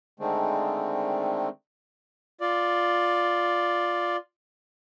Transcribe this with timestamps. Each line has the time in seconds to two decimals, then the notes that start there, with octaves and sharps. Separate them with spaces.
0.20 D3 D#3 G#3 A3 C4
2.41 F4 D5